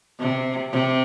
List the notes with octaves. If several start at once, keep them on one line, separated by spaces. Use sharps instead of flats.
C3
C3